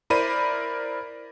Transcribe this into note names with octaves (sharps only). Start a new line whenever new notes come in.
E4 A#4 C5 D5 B5 D#7